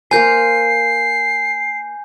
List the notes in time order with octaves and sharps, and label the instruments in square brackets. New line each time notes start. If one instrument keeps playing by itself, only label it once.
[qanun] A#3 A#4 C5 [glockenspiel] G#5 G6 [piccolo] C7